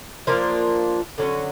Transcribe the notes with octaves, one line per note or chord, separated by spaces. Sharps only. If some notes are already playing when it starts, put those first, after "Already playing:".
F3 A#3 D4 F4
D3 F#3 A3 C#4